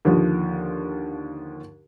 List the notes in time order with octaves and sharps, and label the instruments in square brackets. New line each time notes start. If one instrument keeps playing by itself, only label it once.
[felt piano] D#2 D3 F3